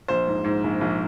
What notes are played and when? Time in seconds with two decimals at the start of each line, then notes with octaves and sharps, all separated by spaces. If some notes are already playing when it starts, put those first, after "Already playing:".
0.08 A#1 C5
0.27 G#2
0.44 G#2
0.64 A#1
0.81 A#1